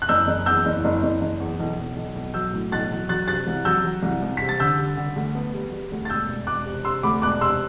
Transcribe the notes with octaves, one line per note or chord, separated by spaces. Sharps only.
F#6
F#1 E6 G6
F#1
E2 E6 G6
F#1
F#1
F#1
F#1
E2
B1
B1
B1
B1
F#3 E6 G6
A2
B1 F#6 A6
F#3
F#3 F#6 A6
C3 F#6 A6
C2
F#3 E6 G6
F#3
C2
C2
C3 B6
A6
D3 E6 G6
G3
D3
D2
B3
G3
G3
D2
A6
E1 E6 G6
E1
E1 D6 F#6
C3
C3 C6 E6
D2 B5 D6
E1 D6 F#6
C3 C6 E6